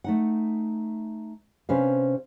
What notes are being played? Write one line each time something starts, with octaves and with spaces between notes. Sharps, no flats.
A3 D#4 F#5
C3 C#4 D4 B4 C5 F5